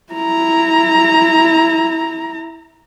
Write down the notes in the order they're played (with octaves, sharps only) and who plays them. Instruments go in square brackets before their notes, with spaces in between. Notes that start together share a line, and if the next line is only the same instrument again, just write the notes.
[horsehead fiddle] E4 A#5